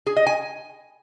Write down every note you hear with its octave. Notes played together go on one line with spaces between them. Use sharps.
G#4
D#5
G#5